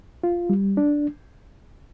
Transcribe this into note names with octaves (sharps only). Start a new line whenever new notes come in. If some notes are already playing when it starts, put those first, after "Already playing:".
F4
G3
D4